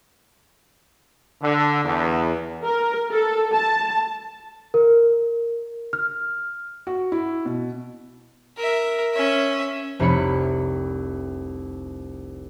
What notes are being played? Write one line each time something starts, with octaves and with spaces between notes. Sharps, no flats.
D3
E2
A#4
A4
A5
A#4
F6
F#4
E4
B2
A#4 E5
C#4 E5
F1 C2 C#5 B5 C#7